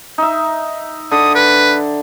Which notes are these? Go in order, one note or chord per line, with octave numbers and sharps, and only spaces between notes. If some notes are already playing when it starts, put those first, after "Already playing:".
D#4 E5
D3 D#6
B4